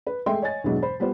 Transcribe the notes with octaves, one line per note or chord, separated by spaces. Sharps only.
B4
G#3 A3 E5 G5 C6
C#5 D#5 G#5 A6
E2 G2 B2 E3 F#3 G#3
C5 B5
G3 B3 F4 C5